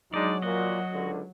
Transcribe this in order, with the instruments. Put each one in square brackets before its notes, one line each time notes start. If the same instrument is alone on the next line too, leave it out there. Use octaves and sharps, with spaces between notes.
[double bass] F#3 [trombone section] G#3 D4 D#4 [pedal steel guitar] D5
[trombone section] A#2 [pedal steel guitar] F#4 D#5
[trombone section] C#2 D3